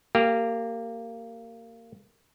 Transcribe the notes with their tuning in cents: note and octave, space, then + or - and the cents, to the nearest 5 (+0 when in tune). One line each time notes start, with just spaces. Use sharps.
A#3 -20 G4 +0